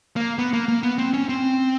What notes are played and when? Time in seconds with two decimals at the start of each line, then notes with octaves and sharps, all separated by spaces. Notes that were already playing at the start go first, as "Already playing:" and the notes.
0.16 A#3
0.38 B3
0.53 A#3
0.68 A#3
0.83 B3
0.98 C4
1.14 C#4
1.29 C4